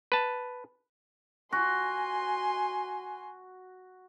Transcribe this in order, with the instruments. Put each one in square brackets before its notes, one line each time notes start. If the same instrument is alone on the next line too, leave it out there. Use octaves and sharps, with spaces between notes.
[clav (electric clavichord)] B4 A5
[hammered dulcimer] F#4 [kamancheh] G#5 C6